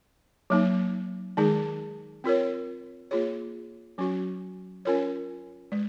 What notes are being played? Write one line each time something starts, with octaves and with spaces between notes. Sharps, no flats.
F#3 A#3 D#4
D#3 G#3 D#4 G#4
C4 F4 A#4 C#5
A#3 F4 G#4 C#5
F#3 C#4 F#4
C#4 F4 A#4 C#5
G#3